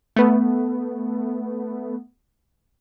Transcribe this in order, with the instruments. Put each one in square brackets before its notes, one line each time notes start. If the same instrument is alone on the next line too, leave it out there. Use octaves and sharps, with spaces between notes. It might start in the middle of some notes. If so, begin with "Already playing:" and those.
[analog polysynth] A3 B3